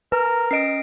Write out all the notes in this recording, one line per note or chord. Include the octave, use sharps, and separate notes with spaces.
A#4 B4
C#4 D#5 A#6 C7 D7